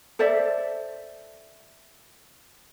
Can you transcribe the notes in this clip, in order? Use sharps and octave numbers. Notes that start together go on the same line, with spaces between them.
A4 C5 D5 E5